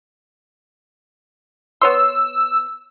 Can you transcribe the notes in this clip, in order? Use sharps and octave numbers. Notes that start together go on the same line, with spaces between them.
B3 C#5 C6 E6